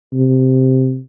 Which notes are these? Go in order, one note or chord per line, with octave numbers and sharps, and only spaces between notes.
C3